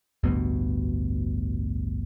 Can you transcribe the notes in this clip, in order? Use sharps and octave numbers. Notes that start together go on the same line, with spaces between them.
A1 D2 G2 B2